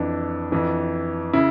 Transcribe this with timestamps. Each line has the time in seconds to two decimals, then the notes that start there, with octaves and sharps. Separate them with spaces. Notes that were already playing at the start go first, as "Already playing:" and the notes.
Already playing: F2 E3 D4
0.52 F2 E3
1.33 C#3 E4